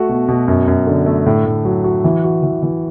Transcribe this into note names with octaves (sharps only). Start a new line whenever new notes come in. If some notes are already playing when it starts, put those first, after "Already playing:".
Already playing: A3 F#4
B2
B2
F#2
F#2
D3
A3
A2
A2
F#3
F#4
E3
F#4
E3
E3